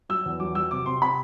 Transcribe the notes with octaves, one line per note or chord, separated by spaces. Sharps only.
F#3 E6
E2
F#3 D6
F#3 E6
C3 D6
C3 C6
C3 B5